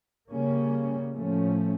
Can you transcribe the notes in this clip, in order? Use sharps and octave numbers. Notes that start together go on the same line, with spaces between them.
C#3 G3 A#3 C#4
A2 F3 A3 C#4